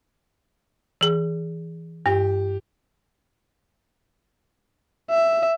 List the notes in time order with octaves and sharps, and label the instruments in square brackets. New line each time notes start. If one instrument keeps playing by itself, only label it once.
[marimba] E3 G#4
[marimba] G2 [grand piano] G4
[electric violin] E5